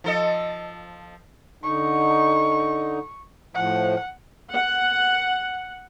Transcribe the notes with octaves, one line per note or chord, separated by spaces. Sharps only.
F3 A4 D#5
D3 D#4 C#6
A2 F3 F#5
F#5